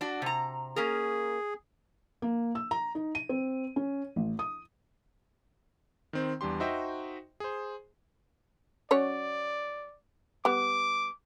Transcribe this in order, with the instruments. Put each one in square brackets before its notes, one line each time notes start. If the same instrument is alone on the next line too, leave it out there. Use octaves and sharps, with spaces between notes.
[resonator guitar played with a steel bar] D4 F#4
C3 A#5
[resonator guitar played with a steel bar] A#3 C#4 A#4 [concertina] G#4
[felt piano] A#3
E6
A#5
D#4
D#7
C4
C#4
A1
D#6
[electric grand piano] D#3 C4 C5
E2 G3 D4 G4 C6
D#4 F#4 C5 D#5 E5 G5
G#4 C5
[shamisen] F#3 C#4 C#5 [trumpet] D5
[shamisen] G3 B3 [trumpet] D6